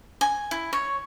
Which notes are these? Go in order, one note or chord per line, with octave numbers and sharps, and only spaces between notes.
G#5
E4
C#5